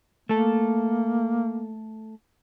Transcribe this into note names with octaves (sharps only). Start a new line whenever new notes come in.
A3 A#3 A4